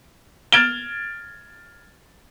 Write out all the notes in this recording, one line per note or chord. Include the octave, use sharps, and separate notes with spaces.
F6 G#6 A6 D7 E7 G7